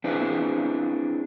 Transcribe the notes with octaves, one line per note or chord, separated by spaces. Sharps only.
C4 D4 E4 G#4 B4 C5